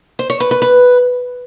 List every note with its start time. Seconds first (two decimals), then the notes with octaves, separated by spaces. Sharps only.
0.19 C5
0.30 C#5
0.40 B4
0.51 B4
0.62 B4